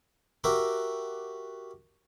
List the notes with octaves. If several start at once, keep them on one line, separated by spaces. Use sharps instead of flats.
F#4 G4 A#4 E5 D6